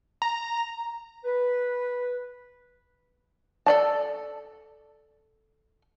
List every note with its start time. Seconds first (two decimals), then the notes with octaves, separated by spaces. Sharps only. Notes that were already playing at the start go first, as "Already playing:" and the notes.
0.22 A#5
1.24 B4
3.66 A4 D5 A5